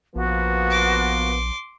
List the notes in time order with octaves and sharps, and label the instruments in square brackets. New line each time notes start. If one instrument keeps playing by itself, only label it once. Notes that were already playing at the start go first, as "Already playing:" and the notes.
[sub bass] A#1 [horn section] F3 A#3 B3 [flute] F#4
[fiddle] C6 D6